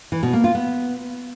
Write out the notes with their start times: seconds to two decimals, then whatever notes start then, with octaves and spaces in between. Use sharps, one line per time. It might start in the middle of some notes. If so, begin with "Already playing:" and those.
0.12 E3
0.23 B2
0.33 A#3
0.44 F4
0.55 B3